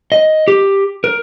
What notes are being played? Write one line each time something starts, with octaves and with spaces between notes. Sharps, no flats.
D#5
G4
A#4